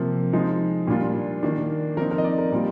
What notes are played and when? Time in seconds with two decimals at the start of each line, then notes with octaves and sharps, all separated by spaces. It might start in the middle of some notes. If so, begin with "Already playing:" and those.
Already playing: C3 F3 A#3
0.33 F3 G#3 D#4
0.87 A#2 G3 D4 F4
1.43 D#3 A#3 D4
1.97 F3 A#4
2.00 C4 D#4
2.11 A#4
2.18 D#5
2.24 D5
2.38 A#4
2.52 A#2 G3 A#3 F4